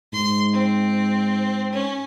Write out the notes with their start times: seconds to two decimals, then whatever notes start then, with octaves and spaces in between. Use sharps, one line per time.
0.13 G#2 C6
0.53 C4
1.73 C#4